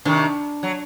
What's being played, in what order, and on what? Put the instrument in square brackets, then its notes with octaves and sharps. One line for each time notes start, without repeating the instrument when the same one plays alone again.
[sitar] C3 D#3 [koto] D4
[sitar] F#3